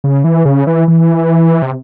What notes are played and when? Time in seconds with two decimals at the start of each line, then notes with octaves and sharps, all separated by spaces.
0.04 C#3
0.24 E3
0.45 C#3
0.67 E3
0.88 E3
1.62 C3